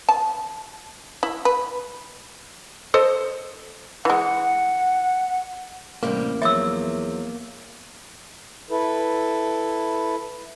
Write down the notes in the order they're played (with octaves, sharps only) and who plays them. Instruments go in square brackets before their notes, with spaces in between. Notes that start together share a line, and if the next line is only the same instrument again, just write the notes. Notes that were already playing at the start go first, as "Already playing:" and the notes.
[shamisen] A5
E4
B4
A4 C5 D#5
[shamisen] E3 G#3 [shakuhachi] F#5
[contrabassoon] A1 [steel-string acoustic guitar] A2 C3 G3 [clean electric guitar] A#3
[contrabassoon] E2 [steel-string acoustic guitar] F3 F#3 [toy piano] E5 E6
[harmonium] E4 A4 B4